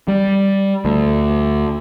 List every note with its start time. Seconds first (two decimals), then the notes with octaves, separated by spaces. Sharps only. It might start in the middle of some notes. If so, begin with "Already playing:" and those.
0.08 G3
0.85 D2